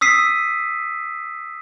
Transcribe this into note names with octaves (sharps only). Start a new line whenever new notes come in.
D#6 E6 B6 C7 D#7